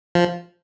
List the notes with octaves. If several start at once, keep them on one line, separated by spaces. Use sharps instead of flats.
F3